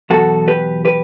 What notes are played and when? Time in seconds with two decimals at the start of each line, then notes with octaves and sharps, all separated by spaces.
0.10 E2 B2 F#3 F#4 A4
0.48 G4 B4
0.85 G4 B4